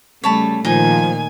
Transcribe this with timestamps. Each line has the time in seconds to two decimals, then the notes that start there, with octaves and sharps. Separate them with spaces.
0.24 C#3 G3 A3 C#5 A5 B5
0.65 A#2 D#3 F3 D#4 G#5